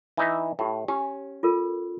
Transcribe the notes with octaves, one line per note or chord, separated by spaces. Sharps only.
E3 D#4 E5
A2 G4 G5
C#4 G4
F4 A4 A#4